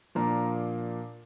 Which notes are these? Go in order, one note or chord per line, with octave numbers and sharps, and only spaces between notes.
A#2 F3 A#3 D4 A#5